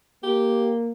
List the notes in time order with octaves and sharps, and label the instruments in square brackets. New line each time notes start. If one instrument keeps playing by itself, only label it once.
[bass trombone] A#3 [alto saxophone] G4